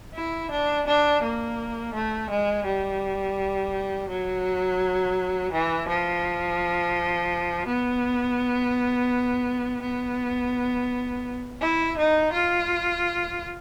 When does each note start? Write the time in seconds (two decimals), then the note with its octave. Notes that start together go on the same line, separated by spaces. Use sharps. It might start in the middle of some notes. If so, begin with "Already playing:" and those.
0.15 E4
0.51 D4
0.87 D4
1.23 A#3
1.94 A3
2.30 G#3
2.66 G3
4.09 F#3
5.52 E3
5.89 F3
7.67 B3
9.82 B3
11.61 E4
11.98 D#4
12.33 F4